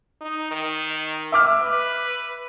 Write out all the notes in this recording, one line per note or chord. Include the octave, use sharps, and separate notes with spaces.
D#4
D#3
E5 D6 F6
B4